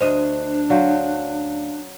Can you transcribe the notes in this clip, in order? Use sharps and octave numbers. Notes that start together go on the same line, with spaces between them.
D2 D4 C5 D#5
F#3 C#4 C5 D5 F5